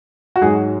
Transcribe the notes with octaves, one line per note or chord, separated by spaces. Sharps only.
F#4
G#2 F#3 G#4